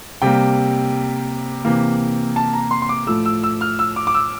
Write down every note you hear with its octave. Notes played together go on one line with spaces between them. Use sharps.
C3 G3 A#3 G5
C3 E3 A#3
A5
A#5
C6
C6
D6
A2 F3 A3 E6
E6
E6
F6
E6
D6
D6
E6